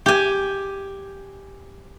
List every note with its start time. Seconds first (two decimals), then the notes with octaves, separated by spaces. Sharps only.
0.06 G4 G#5